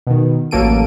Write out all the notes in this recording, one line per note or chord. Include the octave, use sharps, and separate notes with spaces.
B2 D#3
A1 F#3 A#3 A4 D7 D#7